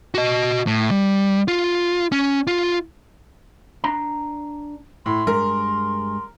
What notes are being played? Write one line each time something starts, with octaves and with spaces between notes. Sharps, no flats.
F#4 D#5
A2
G3
F4
C#4
F4
D4 A#5
A2 C6
G2 G#3 A#4